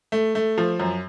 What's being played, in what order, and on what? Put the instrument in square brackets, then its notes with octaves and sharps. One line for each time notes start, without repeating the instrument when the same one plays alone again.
[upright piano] A3
A3
F3
F#2